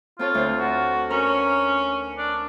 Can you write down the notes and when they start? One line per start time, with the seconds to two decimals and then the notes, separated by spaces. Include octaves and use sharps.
0.19 C4 F4 A4 C#5
0.34 D2 C5
0.59 F#4
1.10 C#4 A#4
2.18 D4